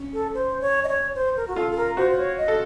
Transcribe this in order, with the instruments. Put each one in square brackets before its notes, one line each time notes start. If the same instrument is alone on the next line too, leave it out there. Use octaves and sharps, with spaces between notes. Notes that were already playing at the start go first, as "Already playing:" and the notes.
Already playing: [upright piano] C#4
[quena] A4
C5
C#5
D#5
C#5
C5
A#4
F#4
[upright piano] F4 [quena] A4
[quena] A4
A#4
[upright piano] F#4 [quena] C5
[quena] C5
C#5
D#5
[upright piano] A4